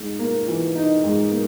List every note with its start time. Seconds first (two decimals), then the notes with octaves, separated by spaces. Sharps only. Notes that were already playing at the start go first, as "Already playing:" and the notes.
Already playing: G#2 D#4
0.19 A#3
0.48 E3
0.75 D#4
1.03 G#2
1.31 A#3